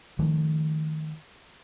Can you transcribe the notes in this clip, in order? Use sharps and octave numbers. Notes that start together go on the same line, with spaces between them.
D#3 F3 A3